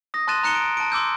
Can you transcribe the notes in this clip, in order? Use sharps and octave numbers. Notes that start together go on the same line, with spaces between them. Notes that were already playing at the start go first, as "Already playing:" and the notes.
D#6 A#6
A5 C6 F#6 A6 D#7 E7
A#5 F#6 C#7 E7 G7
D7
A5 D7
C6 D6 E6 G6